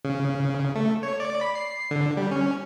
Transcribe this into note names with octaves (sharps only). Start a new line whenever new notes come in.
C#3
A3
C#5
D5
B5
C7
D3
G3
C#4